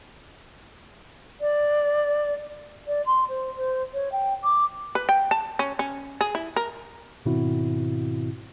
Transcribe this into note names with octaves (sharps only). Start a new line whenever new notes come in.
D5
D5
C6
C5
C5
C#5
G5
D6
B4
G5
A5
C#4
C#4
G#4
E4
A#4
G#2 B2 D#3 C4 E4 F#4